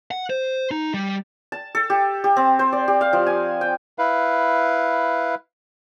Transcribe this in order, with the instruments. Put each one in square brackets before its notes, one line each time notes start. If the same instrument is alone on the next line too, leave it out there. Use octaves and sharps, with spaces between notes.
[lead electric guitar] F#5
C5
D#4
G3
[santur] A5
A4
G4
G4
C4
C5
D5
G4
F5
F3
G#5
G5
[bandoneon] E4 B4 F5